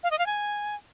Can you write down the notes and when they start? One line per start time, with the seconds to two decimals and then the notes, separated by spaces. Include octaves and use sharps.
0.03 F5
0.11 D#5
0.19 F5
0.26 G#5